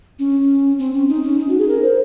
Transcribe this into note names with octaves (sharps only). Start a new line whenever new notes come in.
C#4
C4
C#4
D#4
C#4
D#4
F#4
G#4
A#4
C5